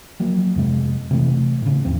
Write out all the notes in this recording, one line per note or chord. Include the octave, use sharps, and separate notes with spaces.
F3 F#3 A#3
F2 C3 G#3
C3 E3 A3
A2 C#3
D#2 F3 C4